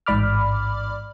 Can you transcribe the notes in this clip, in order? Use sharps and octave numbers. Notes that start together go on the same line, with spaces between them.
A1 G#2 D5 B5 D6 F6